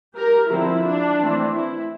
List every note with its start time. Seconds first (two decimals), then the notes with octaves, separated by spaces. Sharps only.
0.17 G4 A#4
0.51 D3 F3 C4 E4
0.85 D4
1.19 E3 A3 C4
1.53 E4